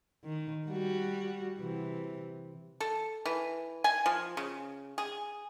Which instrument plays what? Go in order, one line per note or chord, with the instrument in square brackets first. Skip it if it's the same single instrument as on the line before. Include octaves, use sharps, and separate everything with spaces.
[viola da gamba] D#3
G3 F#4
C3 E3
[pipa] A4
E3
G#5
F3
C#3
G#4